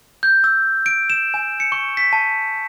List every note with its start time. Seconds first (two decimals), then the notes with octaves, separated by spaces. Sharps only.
0.23 G6
0.44 E6
0.86 D7
1.10 E7
1.34 G#5
1.60 C#7
1.72 C#6
1.97 B6
2.13 A5